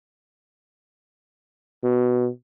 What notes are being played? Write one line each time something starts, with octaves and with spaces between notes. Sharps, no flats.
B2